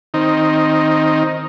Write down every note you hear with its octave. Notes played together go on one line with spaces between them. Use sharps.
D#3 C4 D#4